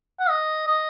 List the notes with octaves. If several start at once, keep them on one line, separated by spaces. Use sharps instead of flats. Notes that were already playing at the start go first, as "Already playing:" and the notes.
F#5
D#5
D#5